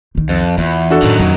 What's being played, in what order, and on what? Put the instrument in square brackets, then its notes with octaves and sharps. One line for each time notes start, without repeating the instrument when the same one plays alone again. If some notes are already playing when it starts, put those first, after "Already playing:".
[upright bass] C2 D#3
[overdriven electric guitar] F2
[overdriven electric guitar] E2 [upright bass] B3 F4
[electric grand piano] D4 F#4 A4
[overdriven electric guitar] F#2 D#3 [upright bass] A2
[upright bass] F2 [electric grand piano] F#3